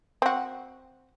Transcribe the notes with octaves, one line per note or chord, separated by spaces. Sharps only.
C4 F#4